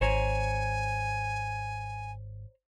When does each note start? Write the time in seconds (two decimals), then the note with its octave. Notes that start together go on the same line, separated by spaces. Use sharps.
0.01 G#1 C5 C#5 G#5 A#5